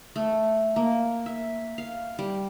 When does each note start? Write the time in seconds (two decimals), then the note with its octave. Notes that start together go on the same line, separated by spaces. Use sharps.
0.16 A3
0.76 A#3
1.26 E5
1.78 F5
2.19 G3